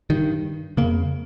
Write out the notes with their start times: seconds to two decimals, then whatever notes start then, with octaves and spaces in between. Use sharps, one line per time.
0.10 G2 D#3
0.77 F2 C#3 A#3